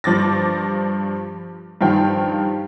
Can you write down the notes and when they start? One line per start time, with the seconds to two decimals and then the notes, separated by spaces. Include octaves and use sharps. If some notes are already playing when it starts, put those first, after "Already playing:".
0.04 G2 F3 D6 A6 A#6
1.81 G2 D#3 F3 F5 G5